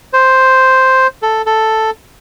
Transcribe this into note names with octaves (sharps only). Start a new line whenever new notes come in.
C5
A4
A4